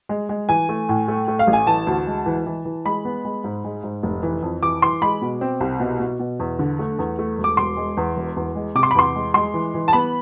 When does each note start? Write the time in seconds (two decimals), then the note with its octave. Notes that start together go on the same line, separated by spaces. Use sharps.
0.09 G#3
0.29 G#3
0.49 E3 G#5
0.69 A3
0.89 A2
1.08 A3
1.28 A3
1.39 F5
1.47 A1
1.53 G#5
1.67 E3 A5
1.87 D2
2.07 G#3
2.26 E3
2.46 E3
2.65 E3
2.85 G#3 B5
3.05 B3
3.25 G#3
3.44 G#2
3.64 G#3
3.83 G#2
4.03 F1
4.23 E3
4.42 F2
4.63 E3 D6
4.82 E3 C6
5.02 G#3 B5
5.22 B2
5.41 C4
5.60 C2
5.80 B2
6.00 B2
6.19 B2
6.39 E2
6.59 D3
6.79 A3
6.99 E2
7.19 A3
7.38 E1
7.44 D6
7.57 E1 C6
7.77 G#3
7.97 E2
8.16 E1
8.37 E2
8.55 G#3
8.75 C3 D6
8.83 C6
8.91 B5
8.95 E2 C6
9.15 G#3
9.34 G#3 C6
9.54 E3
9.74 E3
9.88 A5
9.93 B3 B5